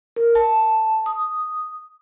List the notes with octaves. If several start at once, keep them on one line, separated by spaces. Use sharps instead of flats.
A#4
A5
D#6